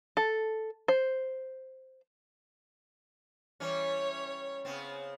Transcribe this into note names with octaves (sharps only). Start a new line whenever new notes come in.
A4
C5
E3 G3 C#4 C#5
C#3 B3 C4